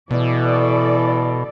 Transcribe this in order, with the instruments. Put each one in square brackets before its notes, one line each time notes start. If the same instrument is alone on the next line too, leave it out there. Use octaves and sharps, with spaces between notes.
[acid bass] B2 [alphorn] E3 [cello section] A4 D5